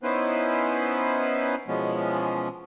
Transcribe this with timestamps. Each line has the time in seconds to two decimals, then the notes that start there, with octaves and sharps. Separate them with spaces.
0.03 B3 C#4 D#4 E4 B4 C5
1.68 B2 E3 F3 G#3 B3 C#4